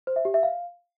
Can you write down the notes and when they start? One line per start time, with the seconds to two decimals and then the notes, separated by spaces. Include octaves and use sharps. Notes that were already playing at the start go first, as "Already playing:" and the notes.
0.07 C5
0.16 E5
0.25 G4
0.34 E5
0.43 F5